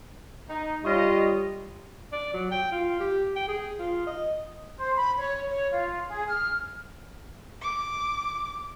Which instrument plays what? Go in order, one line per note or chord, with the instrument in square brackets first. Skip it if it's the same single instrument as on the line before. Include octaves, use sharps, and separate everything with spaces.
[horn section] D#4
[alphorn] G3 [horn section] F4 C#5 D#5
[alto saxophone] D5
F#3
G5
F4
G4
G5
G#4
F4
D#5
[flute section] C5
B5
C#5
C#5
F4
G#4
F6
[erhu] D6